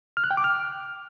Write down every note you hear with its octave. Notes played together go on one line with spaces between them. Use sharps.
F6
F#6
G5
D6
F6